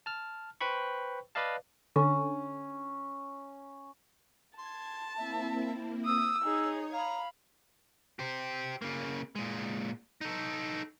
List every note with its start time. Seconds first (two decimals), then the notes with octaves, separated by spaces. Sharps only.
0.06 A5 F6
0.61 B4 C5 G5 B5 C#6
1.35 B4 D5 D#5 F5 A5
1.96 D3 C#4
4.57 A5 C6 G#6
5.17 A#3 C4 E4 E5
6.06 D#6 E6
6.44 D#4 G#4 C#5 D#6 G#6
6.93 F5 A#5 B5
8.19 G4 C5
8.82 C#3 A#3
9.35 A#2 G#3
10.21 D#4 A4